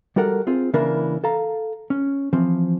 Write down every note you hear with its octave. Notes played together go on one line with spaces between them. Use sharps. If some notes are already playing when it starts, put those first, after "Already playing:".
G3 F#4 A4 A#4 F#5
C4 F4 G#4
C#3 E3 A#3 D4 E4 A#4
A4 F5 A#5
C#4
E3 F3 C4